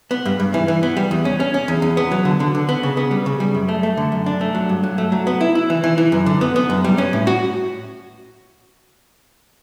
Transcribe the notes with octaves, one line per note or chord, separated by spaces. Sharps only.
B3
G2
G2
E3
E3
B3
G3
E2
C#4
C#4
C#4
E2
E2
B3
F#3
D3
D3
D3
B3
C#3
B3
G3
C#3
G3
F#2
A3
A3
D3
F#2
D4
A3
F#3
G2
F#3
A3
F#3
B3
E4
E4
E3
E3
E3
F#2
D3
B3
B3
F#2
G3
C#4
A2
F#4